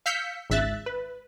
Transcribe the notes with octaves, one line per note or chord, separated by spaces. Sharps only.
F5 E6 G6 B6 C#7
G#1 C#2 E5 F#6 A6
B4